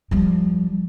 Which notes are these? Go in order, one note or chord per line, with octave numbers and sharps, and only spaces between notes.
F3 G3